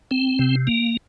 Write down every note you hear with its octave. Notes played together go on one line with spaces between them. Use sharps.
C4
C3
A#3